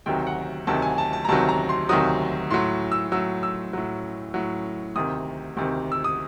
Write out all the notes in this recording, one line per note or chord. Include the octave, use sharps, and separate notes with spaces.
D2 C3 D#3 F#3 G5
F#5
D2 C3 D#3 F#3 A5
G#5
A5
A5
A#5
D2 C3 D#3 F#3 A5
A#5
C6
D2 C3 D#3 F#3 D#6
A2 F#3 C6
E6
A2 F#3 E6
E6
A2 F#3
A2 F#3
D2 C3 D#3 D#6
D2 C3 D#3
E6
D#6